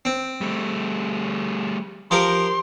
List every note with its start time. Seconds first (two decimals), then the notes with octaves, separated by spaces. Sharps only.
0.05 C4
0.41 G3 A3
2.11 F3 G4 A#4 C6